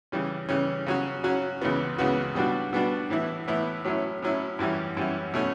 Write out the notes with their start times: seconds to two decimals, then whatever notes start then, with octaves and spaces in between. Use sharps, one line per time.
0.12 C#3 E3 G3 C#4
0.49 C#3 E3 G3 C#4
0.87 C#3 F#3 C#4 F#4
1.23 C#3 F#3 C#4 F#4
1.61 C#2 C#3 E3 B3 F#4
1.98 C#2 C#3 E3 B3 F#4
2.35 B2 G3 B3 D4 F#4
2.73 B2 G3 B3 D4 F#4
3.10 A2 E3 B3 E4
3.48 A2 E3 B3 E4
3.84 A2 F#3 C#4 E4
4.22 A2 F#3 C#4 E4
4.59 F#2 E3 G3 C#4 E4
4.97 F#2 E3 G3 C#4 E4
5.34 B2 A3 C#4